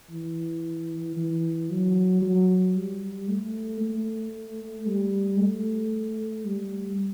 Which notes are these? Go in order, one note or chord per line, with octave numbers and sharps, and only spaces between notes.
E3
E3
F#3
F#3
G3
A3
A3
G3
A3
G3